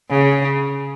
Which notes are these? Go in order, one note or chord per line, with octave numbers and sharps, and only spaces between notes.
C#3